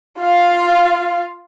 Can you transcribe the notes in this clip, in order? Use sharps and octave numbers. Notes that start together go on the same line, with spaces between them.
F4 F5